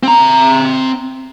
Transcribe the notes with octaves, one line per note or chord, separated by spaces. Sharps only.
C4 A#5